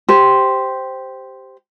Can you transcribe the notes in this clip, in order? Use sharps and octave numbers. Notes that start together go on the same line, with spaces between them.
G4 C5